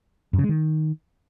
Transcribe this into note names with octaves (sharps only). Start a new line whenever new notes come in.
F#2
C#3
G#3
D#3